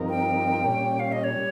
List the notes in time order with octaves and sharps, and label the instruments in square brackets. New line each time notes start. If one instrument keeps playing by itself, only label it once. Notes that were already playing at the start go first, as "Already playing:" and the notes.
Already playing: [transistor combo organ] G2 F3 C4 D#4 A#4
[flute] G5
[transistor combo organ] A#2 G3 C#4
[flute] F5
D#5
C#5
[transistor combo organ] G3